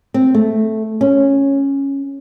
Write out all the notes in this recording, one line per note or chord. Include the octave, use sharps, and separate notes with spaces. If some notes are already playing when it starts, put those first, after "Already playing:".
C4
A3
C#4